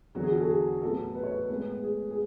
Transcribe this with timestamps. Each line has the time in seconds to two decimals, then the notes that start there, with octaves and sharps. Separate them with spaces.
0.15 E2 D3 F#3 F#4
0.23 G#4
0.31 F#4
0.40 A4
0.49 G#4
0.82 A2 F#3 B3 A4
1.15 B4
1.23 C#5
1.31 B4
1.49 A2 G#3 B3 B4
1.83 G#4
2.11 G#4